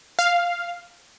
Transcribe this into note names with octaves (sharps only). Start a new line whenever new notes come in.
F5